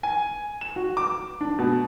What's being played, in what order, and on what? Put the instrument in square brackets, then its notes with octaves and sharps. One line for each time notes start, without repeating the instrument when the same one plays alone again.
[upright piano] G#5
E7
F#4
D6
D4
B2